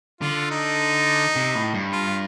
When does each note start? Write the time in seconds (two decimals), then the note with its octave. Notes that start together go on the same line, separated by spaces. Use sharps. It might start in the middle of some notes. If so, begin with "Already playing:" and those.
0.21 D3 F4
0.51 D#4
1.36 C3
1.55 A2
1.74 G2
1.92 F4